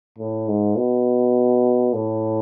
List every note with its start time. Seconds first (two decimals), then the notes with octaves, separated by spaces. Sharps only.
0.18 A2
0.48 G#2
0.77 B2
1.94 A2